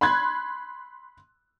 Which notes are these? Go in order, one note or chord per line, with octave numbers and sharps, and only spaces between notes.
B5 C6 F#6 G#6